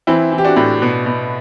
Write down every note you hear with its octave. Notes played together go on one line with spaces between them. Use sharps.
E3 C4 E4
E3
G4
D4 F#4
A2
B2
B2